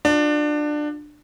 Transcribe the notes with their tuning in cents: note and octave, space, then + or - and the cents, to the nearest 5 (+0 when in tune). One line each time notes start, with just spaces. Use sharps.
D4 +20 F4 +40